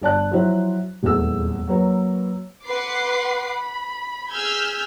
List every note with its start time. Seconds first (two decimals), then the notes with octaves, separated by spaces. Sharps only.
0.01 G1 D5 A5 F#6
0.31 F3 F#3 E4 C5
1.03 D#1 E2 G#3 A3 B3 E6
1.67 F#3 A#3 B4 C#5
2.66 B4 F#5 C6 D6 C7
3.49 B5
4.32 G#4 E6 F6 G6 G#6 B6